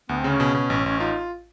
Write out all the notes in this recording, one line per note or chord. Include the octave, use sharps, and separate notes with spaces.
D2 B3
C#3 C4
C#4
B2
B2
A1
A1
D#4 F4